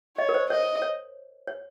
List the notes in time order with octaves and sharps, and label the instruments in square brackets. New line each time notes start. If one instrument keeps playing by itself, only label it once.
[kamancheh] C#5 [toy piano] D#5
[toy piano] A#4
C5
[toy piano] C#5 [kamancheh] D#5
[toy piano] C#5
C#5